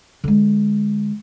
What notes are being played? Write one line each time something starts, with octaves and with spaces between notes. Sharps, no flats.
D3 G#3